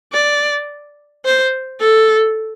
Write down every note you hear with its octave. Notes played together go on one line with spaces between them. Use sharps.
D5
C5
A4